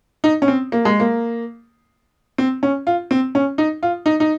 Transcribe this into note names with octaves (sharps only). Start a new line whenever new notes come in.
D#4
C#4
C4
A#3
G#3
A#3
C4
C#4
F4
C4
C#4
D#4
F4
D#4
D#4